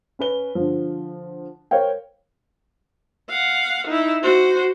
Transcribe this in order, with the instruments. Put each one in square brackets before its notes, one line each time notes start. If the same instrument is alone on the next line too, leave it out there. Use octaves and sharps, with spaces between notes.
[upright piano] C#4 B4 G7
D3 F3
A#4 C5 C#5 F5 G5
[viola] F5 F#5
D#4 E4
F#4 C5